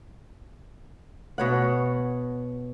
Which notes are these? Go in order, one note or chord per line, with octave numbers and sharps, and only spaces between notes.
B2 C#5 F#5